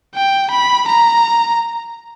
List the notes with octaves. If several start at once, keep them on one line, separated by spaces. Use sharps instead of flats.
G5
B5
A#5